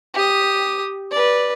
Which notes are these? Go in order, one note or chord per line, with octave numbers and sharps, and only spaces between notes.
G4 D#6
B4 D5